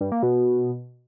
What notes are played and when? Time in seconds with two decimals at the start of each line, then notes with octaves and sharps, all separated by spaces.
0.01 G2
0.12 A#3
0.23 B2